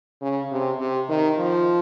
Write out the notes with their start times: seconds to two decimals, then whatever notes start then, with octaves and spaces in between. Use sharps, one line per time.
0.22 C#3
0.51 C3
0.79 C3
1.09 D#3
1.37 F3